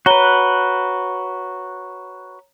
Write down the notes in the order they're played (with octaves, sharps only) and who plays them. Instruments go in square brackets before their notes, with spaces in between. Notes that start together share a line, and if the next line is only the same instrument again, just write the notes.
[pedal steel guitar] F#4 B4 [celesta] C#5 A#5 G7